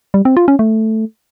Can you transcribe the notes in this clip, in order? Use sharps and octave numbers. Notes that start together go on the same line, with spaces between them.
G3
C4
F4
C#4
A3